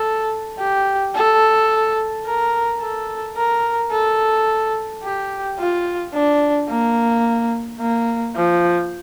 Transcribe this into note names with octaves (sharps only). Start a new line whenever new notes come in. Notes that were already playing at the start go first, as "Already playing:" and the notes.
Already playing: A4
G4
A4
A#4
A4
A#4
A4
G4
F4
D4
A#3
A#3
F3